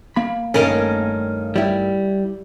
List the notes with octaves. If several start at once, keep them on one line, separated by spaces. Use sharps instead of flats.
A#3 B5
G2 D#3 A3 C#4 A#4
G3 E4